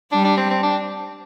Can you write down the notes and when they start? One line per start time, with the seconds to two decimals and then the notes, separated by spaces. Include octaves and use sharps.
0.12 G3 D4
0.25 D4
0.37 C4
0.50 C4
0.63 D4